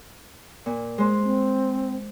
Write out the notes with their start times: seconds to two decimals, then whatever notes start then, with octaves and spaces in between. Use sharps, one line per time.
0.66 A#2
0.98 G#3 C5
1.24 C4